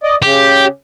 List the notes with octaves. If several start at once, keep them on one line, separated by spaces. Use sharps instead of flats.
D5 D#5
C#3 G4